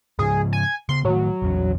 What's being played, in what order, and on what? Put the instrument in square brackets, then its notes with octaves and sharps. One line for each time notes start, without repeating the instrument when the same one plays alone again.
[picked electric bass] G#2 C#3 F3 [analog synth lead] G#4
[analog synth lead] G#5
[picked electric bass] C#3 B3 [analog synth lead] C6
[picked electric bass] A2 D#3 A3 [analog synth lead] F#3
[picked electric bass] A#1 E2 C#4